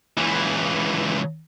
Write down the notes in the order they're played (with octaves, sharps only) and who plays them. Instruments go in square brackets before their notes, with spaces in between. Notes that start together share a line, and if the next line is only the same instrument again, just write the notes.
[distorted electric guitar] C#2 E3